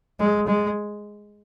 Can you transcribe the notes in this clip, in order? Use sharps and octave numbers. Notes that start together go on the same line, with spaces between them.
G#3
G#3